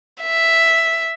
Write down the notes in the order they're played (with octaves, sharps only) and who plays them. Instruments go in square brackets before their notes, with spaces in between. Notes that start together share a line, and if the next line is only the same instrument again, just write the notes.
[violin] E5